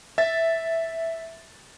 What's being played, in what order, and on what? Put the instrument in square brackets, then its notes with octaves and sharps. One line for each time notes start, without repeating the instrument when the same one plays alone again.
[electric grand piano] E5 A6